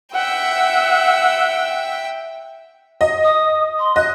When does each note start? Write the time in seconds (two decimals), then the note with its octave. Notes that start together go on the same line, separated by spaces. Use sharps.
0.13 E5 F#5 G5 E6
3.01 D#5
3.24 D#6
3.80 C6
3.96 D#5 F#6